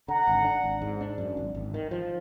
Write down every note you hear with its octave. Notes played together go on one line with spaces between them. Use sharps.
D3 F#5 A#5
G#1
D4
G#1
G#2
D4
F#2
G#1
G#1
D#3
F3